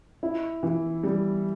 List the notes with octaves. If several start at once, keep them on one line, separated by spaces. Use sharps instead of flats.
E4
E3
G3